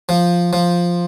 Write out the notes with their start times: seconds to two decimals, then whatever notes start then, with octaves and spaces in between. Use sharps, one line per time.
0.09 F3
0.53 F3